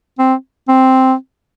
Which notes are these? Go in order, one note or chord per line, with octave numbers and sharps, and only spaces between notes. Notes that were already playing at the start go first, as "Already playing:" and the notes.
C4
C4